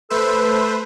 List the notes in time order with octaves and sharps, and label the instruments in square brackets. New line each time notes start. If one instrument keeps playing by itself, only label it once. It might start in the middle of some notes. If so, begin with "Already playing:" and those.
[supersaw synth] A3 B4 C5 [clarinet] A4